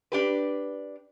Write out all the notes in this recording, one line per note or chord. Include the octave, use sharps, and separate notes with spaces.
D4 G4 B4